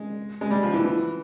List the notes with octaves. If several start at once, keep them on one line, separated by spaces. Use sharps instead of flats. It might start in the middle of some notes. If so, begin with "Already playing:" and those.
Already playing: G#3
G#3
G3
F3
E3
E3